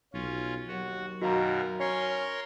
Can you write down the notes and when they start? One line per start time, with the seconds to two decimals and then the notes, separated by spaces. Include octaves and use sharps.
0.13 B1 C#4 F4
0.68 D#2 F#3 F#4
1.21 F#2 B2 D#3 F#4 A#4 F5 A#5
1.80 C#4 A#4 C#5 C6